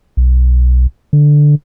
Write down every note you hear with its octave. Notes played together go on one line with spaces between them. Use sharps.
B1
D3